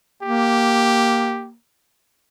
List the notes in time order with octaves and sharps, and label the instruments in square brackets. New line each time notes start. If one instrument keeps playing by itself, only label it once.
[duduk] A#3 [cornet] G4